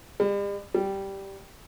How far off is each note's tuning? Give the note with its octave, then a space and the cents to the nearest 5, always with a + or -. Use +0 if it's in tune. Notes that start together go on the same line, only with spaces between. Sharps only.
G3 +45
G3 -5